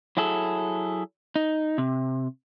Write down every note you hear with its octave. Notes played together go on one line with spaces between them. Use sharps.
F#3 E4 G#4 A4
D#4
C3